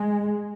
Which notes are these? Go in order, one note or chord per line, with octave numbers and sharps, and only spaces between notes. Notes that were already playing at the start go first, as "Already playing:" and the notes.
Already playing: G#3